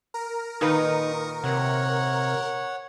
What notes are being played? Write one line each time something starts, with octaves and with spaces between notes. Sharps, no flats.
A#4
A#2 D#3 D#4 B4 C#6 D#6
C3 C#5 F#5